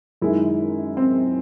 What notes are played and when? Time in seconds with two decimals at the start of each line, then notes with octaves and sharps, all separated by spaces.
0.22 F#2 D#3 G#3 E4
0.97 C4